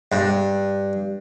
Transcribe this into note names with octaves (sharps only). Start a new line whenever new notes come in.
G2